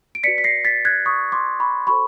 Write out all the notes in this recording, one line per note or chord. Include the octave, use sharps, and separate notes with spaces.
D7
F#4 B4 D5 B6 C#7
B6
A#6 C7
A6 B6
F#6 G#6
C#6 D#6
C6 D6
B5 C#6
F#4 A4 C5 B5 C#6